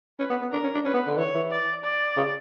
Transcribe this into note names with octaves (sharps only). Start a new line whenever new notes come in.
C#4 B4
B3
B3
D4 A#4
C#4
D4
C#4 B4
B3
D3
E3 C#5
E3
D5
D5
C#3